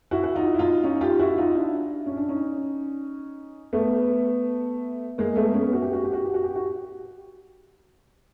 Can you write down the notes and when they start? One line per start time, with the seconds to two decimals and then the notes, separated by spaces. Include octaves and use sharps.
0.11 E4 F#4
0.23 F#4
0.35 D#4 F4
0.54 E4
0.59 D#4 F4
0.84 C#4 D#4
1.01 F4 G4
1.19 E4 F#4
1.38 D#4 F4
1.55 D4 E4
2.06 C#4
2.17 D4
2.29 C#4 D#4
3.73 A3 B3
5.18 G#3 A#3
5.36 A3 B3
5.54 B3 C#4
5.73 F#4
5.82 G4
5.93 F#4
6.04 G4
6.13 F#4
6.25 G4
6.34 F#4
6.44 G4
6.55 F#4